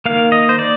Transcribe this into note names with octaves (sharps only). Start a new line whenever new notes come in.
D#3 A#3 F5
D#5
C5
D5